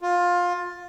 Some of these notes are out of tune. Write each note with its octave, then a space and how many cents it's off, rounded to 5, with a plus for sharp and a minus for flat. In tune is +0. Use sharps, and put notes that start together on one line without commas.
F4 +20